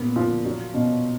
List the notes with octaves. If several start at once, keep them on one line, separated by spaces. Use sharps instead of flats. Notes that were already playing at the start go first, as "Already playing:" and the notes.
Already playing: A#2 B3
F3
F#3
B2